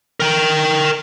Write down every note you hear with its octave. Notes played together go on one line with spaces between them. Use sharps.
A#4 G5